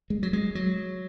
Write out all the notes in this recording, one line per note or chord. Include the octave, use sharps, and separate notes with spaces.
G#3
F#3
G#3
F#3